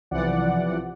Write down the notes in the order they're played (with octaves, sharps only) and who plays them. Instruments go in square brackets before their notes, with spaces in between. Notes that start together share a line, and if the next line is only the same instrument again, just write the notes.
[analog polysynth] B1 C3 E3 F3 D5 F#5